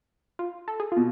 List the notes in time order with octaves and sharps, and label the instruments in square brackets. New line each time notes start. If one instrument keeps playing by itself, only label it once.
[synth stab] F4
A4
G#4
[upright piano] B2 [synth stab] F4